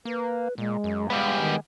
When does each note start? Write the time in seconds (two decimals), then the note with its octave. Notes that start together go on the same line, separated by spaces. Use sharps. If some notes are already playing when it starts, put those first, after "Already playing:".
0.05 A#3 B4
0.58 A#2 G#3
0.84 F#2
1.10 G3 G#3 B3 F5
1.40 D#3